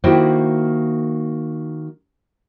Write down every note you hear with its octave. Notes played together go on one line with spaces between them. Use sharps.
D#3 A#3 E4 F#4 G4 C5